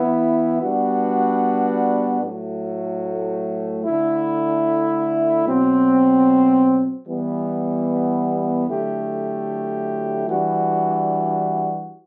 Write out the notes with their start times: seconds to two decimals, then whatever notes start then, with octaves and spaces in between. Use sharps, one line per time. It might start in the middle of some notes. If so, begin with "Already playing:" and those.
Already playing: E3 B3 E4
0.62 G3 B3 D4 F#4
2.22 A2 F#3 A3
3.83 D3 A3 E4
5.44 B2 F#3 C4
7.06 E3 G3 B3
8.66 D3 F#3 A3 E4 G4
10.27 E3 G3 D4 F#4